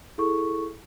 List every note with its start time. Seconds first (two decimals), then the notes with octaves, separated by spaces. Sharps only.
0.18 E4 G#4 A4 C#6